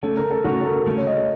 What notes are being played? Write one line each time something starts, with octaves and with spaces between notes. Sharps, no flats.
C#3 A3 C#4 A4
A#4
A4
C#3 A3 C#4 F#4
A4
A#4
C#3 A3 C#4
C#5
D#5
C#5